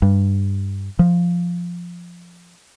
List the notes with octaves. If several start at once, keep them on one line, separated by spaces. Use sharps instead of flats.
G2
F3